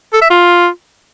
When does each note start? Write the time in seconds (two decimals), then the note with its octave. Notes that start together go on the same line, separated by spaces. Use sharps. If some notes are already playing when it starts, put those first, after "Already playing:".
0.13 A4
0.22 E5
0.30 F4